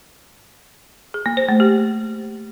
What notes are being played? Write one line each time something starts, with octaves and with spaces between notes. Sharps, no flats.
G#4
A#3
C5
A3
G4